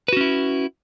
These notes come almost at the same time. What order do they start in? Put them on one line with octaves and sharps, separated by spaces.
B4 F#4 C#4 E4